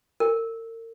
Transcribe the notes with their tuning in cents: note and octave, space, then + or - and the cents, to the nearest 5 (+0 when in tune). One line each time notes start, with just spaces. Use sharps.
A#4 -40